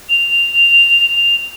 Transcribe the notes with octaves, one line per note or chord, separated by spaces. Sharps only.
F7